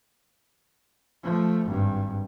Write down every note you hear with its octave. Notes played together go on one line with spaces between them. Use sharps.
F3 A3
G#1 G2